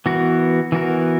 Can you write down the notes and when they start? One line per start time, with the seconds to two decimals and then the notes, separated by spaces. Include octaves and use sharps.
0.06 E3 B3 F#4 A#4
0.72 E3 B3 F#4 A#4